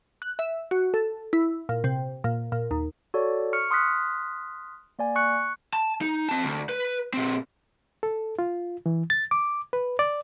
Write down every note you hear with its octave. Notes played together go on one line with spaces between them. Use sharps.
F#6
E5
F#4
A4
E4
A#2
C3
A#2
A#2
D#2
F#4 A4 C#5 D5
C#6 F6 C#7
C6 D#6 F6 F#6 B6
A#3 D5 G#5
C#6 F#6 C#7
A5
D#4
C4 A5
D2
B4
A#2 C4
A4
F4
E3
A6
D6
B4
D5